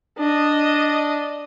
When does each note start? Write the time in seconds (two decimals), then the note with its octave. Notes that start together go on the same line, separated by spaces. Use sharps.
0.18 D4 D#5